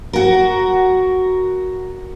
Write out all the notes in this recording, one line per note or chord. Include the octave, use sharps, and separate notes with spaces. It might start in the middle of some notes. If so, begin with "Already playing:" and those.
F#4 A#4